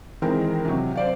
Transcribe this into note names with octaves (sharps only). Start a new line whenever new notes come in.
D#3 E3 G#3 C4 A#4
C3 F#3
C5 D5 F5